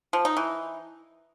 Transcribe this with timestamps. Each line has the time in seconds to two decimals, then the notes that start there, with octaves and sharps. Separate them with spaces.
0.13 F3
0.25 D#4
0.37 E3